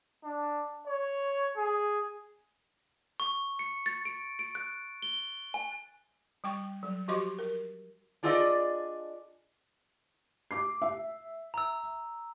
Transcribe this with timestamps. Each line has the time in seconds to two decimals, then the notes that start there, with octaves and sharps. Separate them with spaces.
0.24 D4
0.87 C#5
1.57 G#4
3.20 C#6
3.59 C#7
3.86 A6
4.05 D7
4.39 D7
4.55 F#6
5.02 G7
5.54 G#5
6.44 G3 G5 C#6
6.83 F#3
7.08 F3 F#4 G4 D#5 C6 C#6
7.39 A#4
8.23 D4 F4 G#4 A4 D5 D#5
10.51 D6 C7
10.82 E5
11.54 A#5 E6